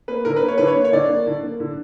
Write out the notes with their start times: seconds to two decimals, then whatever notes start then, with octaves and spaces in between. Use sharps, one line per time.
0.08 A#3 B4
0.25 D3 A#4
0.36 B4
0.43 A#3
0.48 C#5
0.58 D3 B4
0.68 C#5
0.75 A#3
0.85 C#5
0.93 D3 D5
1.09 A#3
1.27 D3
1.43 A#3
1.60 D3